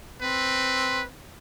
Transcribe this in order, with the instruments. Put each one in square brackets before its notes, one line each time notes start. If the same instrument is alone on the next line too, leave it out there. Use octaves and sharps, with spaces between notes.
[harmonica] C4 [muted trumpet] B4